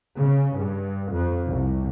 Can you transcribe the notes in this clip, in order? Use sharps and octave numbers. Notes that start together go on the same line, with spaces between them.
C#3
G2
F2
C2